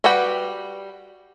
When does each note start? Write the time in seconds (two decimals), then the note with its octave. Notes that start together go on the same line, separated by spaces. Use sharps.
0.04 G3 F#4 B4 F#5 G5